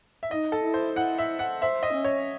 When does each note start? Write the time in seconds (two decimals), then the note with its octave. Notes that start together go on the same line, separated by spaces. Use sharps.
0.23 E5
0.31 D#4 D#5
0.52 A4
0.63 E4
0.74 C5
0.96 E4 F#5
1.19 E5
1.39 F#5
1.61 C5 E5
1.83 D#5
1.94 C#4
2.04 C#5